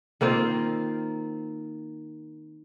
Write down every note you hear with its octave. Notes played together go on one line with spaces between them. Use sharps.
D#3 A#3 C4 F4